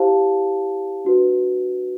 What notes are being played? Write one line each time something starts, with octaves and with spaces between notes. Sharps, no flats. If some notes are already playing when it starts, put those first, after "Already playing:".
Already playing: E4 G4 C5 F5 A5
D4 F#4 B4